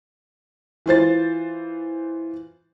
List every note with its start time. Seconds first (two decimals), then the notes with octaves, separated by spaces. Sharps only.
0.86 E3 F4 C5 A6